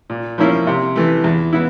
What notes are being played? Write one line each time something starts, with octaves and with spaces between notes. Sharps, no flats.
A#2
F3 A#3 C#4 E4
C3
E3 A3
E2
B3 E4